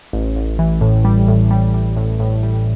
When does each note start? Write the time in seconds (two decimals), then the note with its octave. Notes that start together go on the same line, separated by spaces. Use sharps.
0.13 A1
0.36 A1
0.59 E3
0.81 A2
1.05 G3
1.28 A2
1.51 G3
1.74 G3
1.97 A2
2.20 A2
2.43 G3